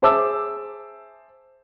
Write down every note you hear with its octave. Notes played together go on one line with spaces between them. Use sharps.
G#4 C5 E5 A5 D6 E6